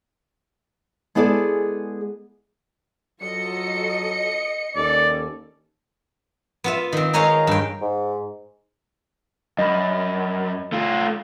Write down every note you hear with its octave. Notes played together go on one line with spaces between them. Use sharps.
G#3 B3 E4 G#4 A4 D5
F#3 F4 A4 D#5 C#7
D#2 C#4 A4 D5
B3 F4 E5
D#3 C4
D#4 G#4 A#4 C#5 D#5 F5
G2 G5
G#2
F#2 D#5 B5
A3 F4